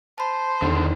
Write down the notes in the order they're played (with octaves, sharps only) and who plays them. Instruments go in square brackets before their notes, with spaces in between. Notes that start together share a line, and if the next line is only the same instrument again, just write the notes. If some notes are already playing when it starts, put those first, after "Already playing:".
[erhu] C5 [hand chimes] A5 B5
[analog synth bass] E2 [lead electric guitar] D3 D#3